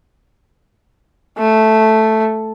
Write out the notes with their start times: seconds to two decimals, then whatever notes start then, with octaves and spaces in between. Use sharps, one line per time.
1.38 A3